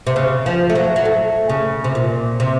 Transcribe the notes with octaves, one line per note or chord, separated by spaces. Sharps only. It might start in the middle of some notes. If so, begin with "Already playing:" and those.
C3
C#3
F3
A3
F#3
F#3
A3
C#3
C3
A#2
C3